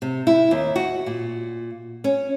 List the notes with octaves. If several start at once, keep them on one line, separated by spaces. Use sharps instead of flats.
C3
E4
D#2
F#4
A#2
C#4